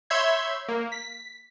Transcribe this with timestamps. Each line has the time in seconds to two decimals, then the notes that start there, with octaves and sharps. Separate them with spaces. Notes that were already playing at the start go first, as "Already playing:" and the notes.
0.10 C#5 E5 B5 C6 G6 G#6
0.68 A#3
0.92 B6